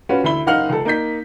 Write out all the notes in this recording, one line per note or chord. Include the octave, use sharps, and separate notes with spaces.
C#4 F4 F#4 B4
D2 E4 B5 G7
F#1 D#4 F5 F#5 F6 F#7
C#2 A4
A#3 D#4 G6 B6